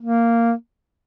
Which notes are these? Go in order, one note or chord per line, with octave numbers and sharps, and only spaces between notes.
A#3